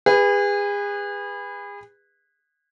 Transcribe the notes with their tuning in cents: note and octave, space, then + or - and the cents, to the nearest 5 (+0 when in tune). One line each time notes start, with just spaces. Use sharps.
G#4 -35 B4 +0